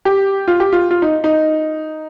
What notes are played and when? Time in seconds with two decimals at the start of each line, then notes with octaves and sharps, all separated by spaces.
0.05 G4
0.48 F4
0.60 G4
0.73 F4
0.91 F4
1.02 D#4
1.24 D#4